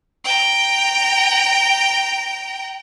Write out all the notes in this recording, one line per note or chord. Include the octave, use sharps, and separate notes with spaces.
G5 A#5